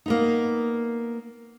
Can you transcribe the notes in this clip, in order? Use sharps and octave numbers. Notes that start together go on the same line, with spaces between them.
A#3 B3 D#4